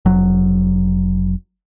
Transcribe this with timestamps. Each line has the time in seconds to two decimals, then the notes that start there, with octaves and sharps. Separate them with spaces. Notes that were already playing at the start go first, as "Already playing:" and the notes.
0.05 F1 F#3